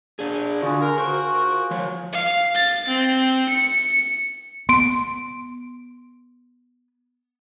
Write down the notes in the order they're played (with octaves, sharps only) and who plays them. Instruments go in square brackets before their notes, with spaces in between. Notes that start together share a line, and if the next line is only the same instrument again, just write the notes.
[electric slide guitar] D4 G#4
[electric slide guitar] D3 [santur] F4 G#4 [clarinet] F#4
[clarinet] A#4
[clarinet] F#4 [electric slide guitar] A#4 [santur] C5
[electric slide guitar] F3 C#5
[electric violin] F5
A6
C4
C#7
[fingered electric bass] B3 [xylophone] C6 D7